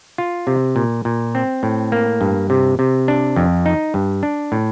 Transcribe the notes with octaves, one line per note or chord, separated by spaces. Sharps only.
F4
C3
A#2
A#2
C4
A2
A#3
G2
C3
C3
D4
F2
D#4
G2
D4
A2